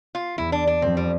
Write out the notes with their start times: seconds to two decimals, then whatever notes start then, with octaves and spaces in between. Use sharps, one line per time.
0.15 F4
0.37 E2 E4
0.52 D4
0.67 D4
0.82 F2 C4
0.97 G3